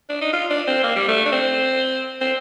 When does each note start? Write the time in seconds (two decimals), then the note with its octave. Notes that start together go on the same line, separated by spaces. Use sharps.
0.09 D4
0.21 D#4
0.33 F4
0.50 D4
0.67 C4
0.83 A#3
0.96 G3
1.08 A3
1.25 D4
1.32 C4
2.21 C4